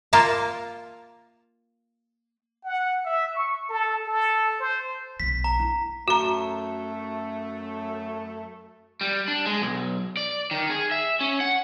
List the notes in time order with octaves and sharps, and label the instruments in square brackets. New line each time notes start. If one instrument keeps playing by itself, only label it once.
[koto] A#3 F4 A#4 A5
[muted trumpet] F#5
E5
C#6
A4
A4
C5
[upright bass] B1 D#3 [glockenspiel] B6
[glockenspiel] A#5
[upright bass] E4
[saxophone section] F#2 A3 [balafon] F#4 A#5
[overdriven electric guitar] G3
D4
G#3
B1
D5
D#3
G#4
E5
C#4
F#5